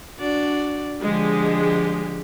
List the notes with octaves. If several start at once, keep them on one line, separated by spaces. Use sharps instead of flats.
D4 F#4 D5
D3 F3 G#3 G4